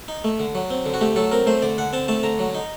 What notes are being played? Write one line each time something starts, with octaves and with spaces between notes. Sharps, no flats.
D#4
A3
D3
F#3
C4
D3
F#4
A3 G4
F#3 A4
C4 A#4
A3 C5
D3 D5
D3 F#5
C4 A5
A3 A5
D3 A#5
F#3
D#4